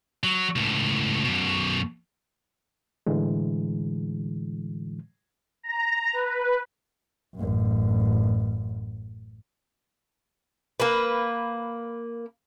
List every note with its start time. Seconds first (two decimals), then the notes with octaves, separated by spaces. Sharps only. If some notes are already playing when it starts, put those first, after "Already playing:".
0.24 F#3
0.56 C#2 A2
1.24 F#2 B2
3.06 A2 D3 E3 G#3
5.63 A#5
6.13 B4
7.34 A1 F#2
10.80 A#3 B4